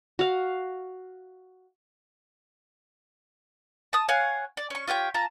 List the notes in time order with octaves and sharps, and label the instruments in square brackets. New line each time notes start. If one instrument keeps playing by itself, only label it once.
[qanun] F#4 F5
[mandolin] A5 D#6
C#5 F5 F#5 G#5
D5
C#4 C#6
F4 G4 C#5 G5
F4 A5 A#5